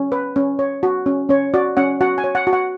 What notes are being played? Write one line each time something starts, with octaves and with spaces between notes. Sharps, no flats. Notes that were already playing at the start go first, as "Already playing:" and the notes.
Already playing: C#4
B4
C#4
C#5
F#4
C#4
C#4 C#5
F#4 D5
C#4 F#5
F#4 F#5
G#5
C#5
F#5
F#4
F#5